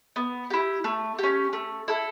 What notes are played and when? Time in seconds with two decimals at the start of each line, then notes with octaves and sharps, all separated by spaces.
0.16 B3
0.50 E4 G4
0.84 A3
1.19 C#4 G4
1.53 A3
1.88 E4 A4